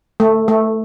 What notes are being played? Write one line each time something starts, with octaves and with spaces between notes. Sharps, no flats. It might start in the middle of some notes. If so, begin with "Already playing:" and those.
A3
A3